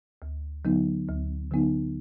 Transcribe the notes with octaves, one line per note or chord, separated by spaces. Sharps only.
D2
D3 F#3 B3 D#4
D2
D3 F#3 B3 D#4